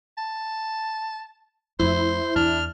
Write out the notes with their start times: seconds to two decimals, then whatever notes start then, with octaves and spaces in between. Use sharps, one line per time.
0.18 A5
1.79 F2 A3 E4 C5
2.36 E2 D4 F6